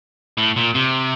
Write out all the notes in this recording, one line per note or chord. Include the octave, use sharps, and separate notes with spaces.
A2
A#2
C3